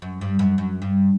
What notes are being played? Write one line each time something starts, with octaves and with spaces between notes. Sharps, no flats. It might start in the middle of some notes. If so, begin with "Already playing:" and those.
F#2
G2
F#2
F#2
G2